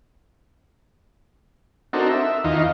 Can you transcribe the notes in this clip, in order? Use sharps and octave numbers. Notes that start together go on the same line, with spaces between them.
C4 D4 D#4 F#4 A4 A#4
E5
E2 D#3 D#4 F4